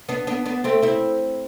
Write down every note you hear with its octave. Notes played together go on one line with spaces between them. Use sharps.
B3 D4
B3 D4
B3 D4
A3 C4
C4 E4